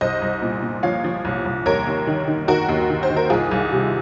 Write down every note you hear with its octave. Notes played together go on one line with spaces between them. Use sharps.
C2 C5 D#5
C2
A#2
A#2
F3 C#5 F5
F3
C2
C2
D#2 A#4 C#5
D#2
D#3
D#3
D#3 F#4 A#4
D#2
D#3
C5
D#3
A#4
C2 F4 G#4
C2
C3